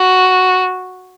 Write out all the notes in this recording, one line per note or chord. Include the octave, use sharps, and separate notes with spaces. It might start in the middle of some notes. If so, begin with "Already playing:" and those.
Already playing: F#4